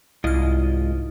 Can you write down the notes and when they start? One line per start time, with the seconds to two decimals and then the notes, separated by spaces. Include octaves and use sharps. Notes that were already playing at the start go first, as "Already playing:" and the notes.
0.24 C2 G#2 E4 F4 D#5 F6